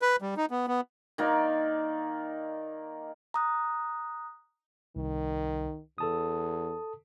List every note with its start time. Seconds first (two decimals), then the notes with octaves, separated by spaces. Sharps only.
0.02 B4
0.22 G3
0.37 D#4
0.51 B3
0.68 B3
1.18 D#3 A#3 D5
3.34 A#5 D#6 F#6
4.96 C2 D#3
5.98 E2 A4 A5 D#6